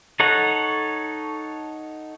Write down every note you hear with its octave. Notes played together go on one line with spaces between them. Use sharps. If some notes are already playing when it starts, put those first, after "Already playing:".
D#4 A4 C#5 F#5